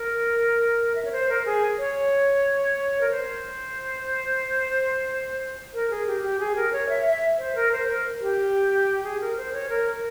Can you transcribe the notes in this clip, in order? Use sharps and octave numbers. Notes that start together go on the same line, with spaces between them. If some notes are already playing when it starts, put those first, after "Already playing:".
Already playing: A#4
E5
C#5
C5
A#4
G#4
C#5
A#4
C5
A#4
G#4
G4
G4
G#4
A#4
C#5
E5
E5
C5
A#4
C5
A#4
G4
G#4
A#4
C5
C#5
A#4